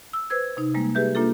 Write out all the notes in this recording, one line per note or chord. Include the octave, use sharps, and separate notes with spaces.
E6
B4 C5 E6 G#6
C3 D#4
G3 G#3 A#3
G4 G#4 B4 E5 G6
A#3 D4 F4 A4